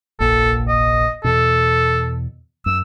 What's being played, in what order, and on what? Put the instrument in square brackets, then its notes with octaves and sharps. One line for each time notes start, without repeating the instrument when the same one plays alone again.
[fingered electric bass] F1 A#1 A#2 [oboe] A4
[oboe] D#5
[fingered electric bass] E2 B2 [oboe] A4
[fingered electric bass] F#2 [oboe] E6